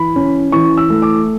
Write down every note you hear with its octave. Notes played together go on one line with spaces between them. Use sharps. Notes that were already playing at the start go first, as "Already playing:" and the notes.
Already playing: E3 B5
C#4
E3 C#6
E6
A3
D6